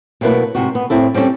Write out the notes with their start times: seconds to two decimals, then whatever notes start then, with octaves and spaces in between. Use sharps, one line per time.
0.21 B2 F#3 A3 A#3 E4 B4
0.55 G#2 C3 F#4
0.75 B3
0.90 A2 C4 E4 A4
1.15 G3 C4 C#4 F4 A4